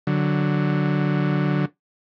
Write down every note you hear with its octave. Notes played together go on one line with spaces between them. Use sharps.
D3 F#3